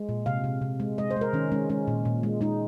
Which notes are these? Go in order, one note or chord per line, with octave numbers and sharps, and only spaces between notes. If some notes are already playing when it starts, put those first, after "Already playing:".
Already playing: G#3
A#2
C3 F5
C3
C3
G#3
G#3 D#5
C5
G#3 A#4
D#3 C#4
G#3 C#4
G#3 C#4
A#2
A#2
G#3
G#3 D#4